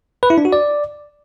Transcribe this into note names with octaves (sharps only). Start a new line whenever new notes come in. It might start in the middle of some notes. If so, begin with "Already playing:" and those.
B4
E4
D4
F#4
D5